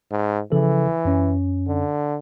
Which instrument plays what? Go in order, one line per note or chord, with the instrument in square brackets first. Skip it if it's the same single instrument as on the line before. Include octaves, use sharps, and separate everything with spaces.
[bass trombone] G#2
[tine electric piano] C#3 F3 A4 [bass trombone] E3
[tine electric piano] F#2 C#4
[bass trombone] D3